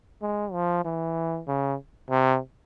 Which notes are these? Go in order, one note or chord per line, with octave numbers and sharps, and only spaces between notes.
G#3
F3
E3
C#3
C3